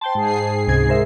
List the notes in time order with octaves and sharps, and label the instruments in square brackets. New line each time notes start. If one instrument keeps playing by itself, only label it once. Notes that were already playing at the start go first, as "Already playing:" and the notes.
[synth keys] C5 G5 A5 [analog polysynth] C6
[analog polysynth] G#2 G#4 C7
[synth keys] C#2 C3 G#6
A#4 C5 E5